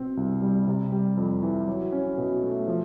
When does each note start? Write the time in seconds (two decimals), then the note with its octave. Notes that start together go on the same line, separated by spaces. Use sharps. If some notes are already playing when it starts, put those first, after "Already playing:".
Already playing: B2 C4
0.17 C2
0.42 G3
0.67 C3
0.92 G3
1.17 F2
1.43 E3
1.68 F#3
1.92 C#4
2.18 B2
2.43 A3
2.68 F3